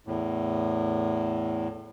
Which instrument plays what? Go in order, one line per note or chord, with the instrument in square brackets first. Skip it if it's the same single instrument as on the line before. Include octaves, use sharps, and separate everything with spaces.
[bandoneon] E2 A2